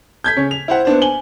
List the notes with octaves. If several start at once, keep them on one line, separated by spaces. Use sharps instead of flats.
G6 G#6 B6
C#3 C#5
F7
E4 C5 F#5
B3 D4 C5
G#5 F#7 G7